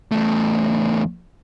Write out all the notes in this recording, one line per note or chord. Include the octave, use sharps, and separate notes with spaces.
E2 A3